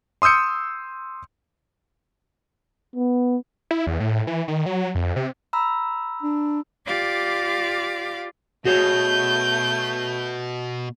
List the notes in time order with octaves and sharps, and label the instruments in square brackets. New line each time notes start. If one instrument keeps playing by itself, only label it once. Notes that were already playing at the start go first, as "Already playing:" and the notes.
[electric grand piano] C6 D#6 E6 G6 C#7
[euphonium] B3
[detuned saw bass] E4
E2
A2
E3
D#3
F#3
F2
C3
[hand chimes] A#5 B5 E6
[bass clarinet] D4
[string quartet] F4 G4 D5 F5 D6
[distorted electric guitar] B2 [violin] A3 G6 [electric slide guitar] F#4 G#4 C#5